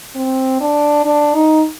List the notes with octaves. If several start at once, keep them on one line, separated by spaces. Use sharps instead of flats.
C4
D4
D4
D#4